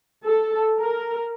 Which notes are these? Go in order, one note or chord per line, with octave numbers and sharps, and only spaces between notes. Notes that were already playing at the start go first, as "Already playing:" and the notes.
A4
A#4